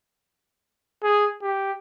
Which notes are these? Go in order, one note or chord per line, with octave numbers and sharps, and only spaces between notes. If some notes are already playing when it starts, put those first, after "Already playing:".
G#4
G4